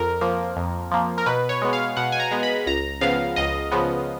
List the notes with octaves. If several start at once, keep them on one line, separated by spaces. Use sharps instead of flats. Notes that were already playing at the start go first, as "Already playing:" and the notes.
Already playing: F2 A#4
F3 A#3
F2
F3 A#3
A#4
B2 B4
C#5
G#3 B3
F5
B2 F#5
G#5
A#5
G#3 B3
B5
C#2 A#5
C#3 F3 B3 F5
C#2 D#5
C#3 F3 B3